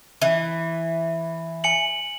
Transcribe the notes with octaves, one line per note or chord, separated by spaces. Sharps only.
E3
G#5 C#7 F#7